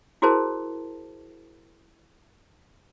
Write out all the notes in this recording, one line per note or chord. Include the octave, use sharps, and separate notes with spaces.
E4 F#4 G#4 A#4 C5 A5